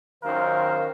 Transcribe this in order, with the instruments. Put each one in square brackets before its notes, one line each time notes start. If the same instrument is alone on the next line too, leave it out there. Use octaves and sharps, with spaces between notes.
[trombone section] F#2 A#2 A#4 [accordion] D#3 [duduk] C5 [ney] F5